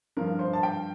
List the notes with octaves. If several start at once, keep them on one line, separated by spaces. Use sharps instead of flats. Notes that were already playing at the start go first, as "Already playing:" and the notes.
G2 F3 A#4
C5
A5
G5